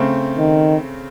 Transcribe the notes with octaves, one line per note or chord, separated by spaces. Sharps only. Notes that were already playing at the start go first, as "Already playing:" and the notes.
Already playing: C#3 A3 C4
D#3